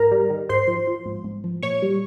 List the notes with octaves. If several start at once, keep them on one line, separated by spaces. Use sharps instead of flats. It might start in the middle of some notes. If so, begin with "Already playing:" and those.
Already playing: G#2 A#4 A#5
G3
D#3
G#2 C5 C6
F3
F3
G#2
G#2
F3
A#2 C#5 C#6
G3